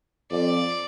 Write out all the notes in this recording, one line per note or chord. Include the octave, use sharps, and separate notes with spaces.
F2 D5